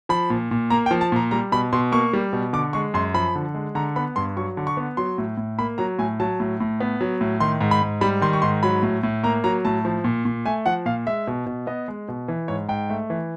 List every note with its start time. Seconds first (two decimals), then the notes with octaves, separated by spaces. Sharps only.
0.09 F3 B5
0.30 A#2
0.51 A#2
0.70 A#3 A#5
0.86 G5
0.91 F3
1.01 A5
1.12 A#2 A#5
1.31 G3 A#5
1.52 B2 B5
1.73 B2 C6
1.92 A#3 C#6
2.13 G3
2.33 B2
2.53 D3 D6
2.73 G#3 C#6
2.94 F#2 C6
3.14 F3 B5
3.35 D3
3.54 G#3
3.75 D3 A#5
3.96 B3 B5
4.16 G2 C6
4.37 F#3 C#6
4.57 D3
4.67 C#6
4.77 B3
4.97 F#3 C6
5.18 A2
5.37 A2
5.58 A#3 B5
5.78 F#3 A#5
5.98 A2 G#5
6.20 F#3 A5
6.40 A2
6.60 A2
6.80 B3
7.01 F#3
7.21 A2
7.40 D#3 C6
7.61 G#2
7.71 B5
7.82 G#2
8.01 G3 B5
8.22 D#3 C6
8.33 C#6
8.42 G#2 C6
8.63 F#3 B5
8.83 A2
9.03 A2
9.23 A#3 A#5
9.44 F#3 A#5
9.65 A2 A5
9.85 F3
10.04 A#2
10.25 A#2
10.46 A3 G#5
10.66 F3 F#5
10.86 A#2 F5
11.07 G#3 E5
11.27 B2
11.46 B2
11.67 B3 D#5
11.88 G#3
12.08 B2
12.28 E3
12.48 G#2 C#5
12.69 G#2 G5
12.90 A3
13.10 E3